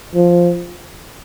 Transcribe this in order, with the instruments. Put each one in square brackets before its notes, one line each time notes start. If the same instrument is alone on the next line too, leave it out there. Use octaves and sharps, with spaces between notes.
[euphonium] F3